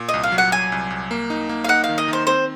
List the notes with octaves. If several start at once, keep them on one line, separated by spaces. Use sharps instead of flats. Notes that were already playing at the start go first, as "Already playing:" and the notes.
Already playing: A#2
D#5
C2
F5
F#3
F#5
F#3 G#5
C2
C2
A#3
D#4
A#3
F5
D#4 F#5
F5
D#3
D#5
D#3
C5
C4 C5